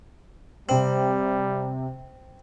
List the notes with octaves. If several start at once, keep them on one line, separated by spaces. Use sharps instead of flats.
C3 G3 C4 F#7